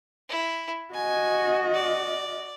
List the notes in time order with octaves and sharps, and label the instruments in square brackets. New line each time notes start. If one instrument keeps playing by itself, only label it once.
[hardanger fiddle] E4
[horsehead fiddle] F#4 D#5 [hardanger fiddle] G#5
[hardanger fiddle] D5